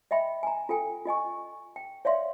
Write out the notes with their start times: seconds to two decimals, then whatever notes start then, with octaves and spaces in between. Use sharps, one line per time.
0.11 D#5 E5 G5 B5
0.43 G#5 A#5
0.69 F4 A4 G5 G#5
1.06 F4 D#5 G#5 C#6
1.76 G5
2.05 C#5 D5 E5 F5 C6